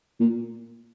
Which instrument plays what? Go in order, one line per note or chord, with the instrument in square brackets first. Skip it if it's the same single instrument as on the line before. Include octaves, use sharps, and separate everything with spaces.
[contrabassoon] A#2